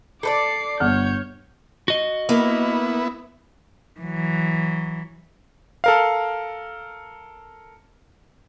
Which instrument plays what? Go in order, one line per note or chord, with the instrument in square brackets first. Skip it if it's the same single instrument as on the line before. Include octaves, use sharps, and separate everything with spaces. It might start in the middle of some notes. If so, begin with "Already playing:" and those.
[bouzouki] A4 B4 D5 [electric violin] D6 C7
[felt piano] G1 F#5 F6 [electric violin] C#5 G6
[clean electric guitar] F#4 D#5
[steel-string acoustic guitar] A#3 [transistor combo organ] B3 E4
[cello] E3 F#3
[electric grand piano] A4 A#4 F5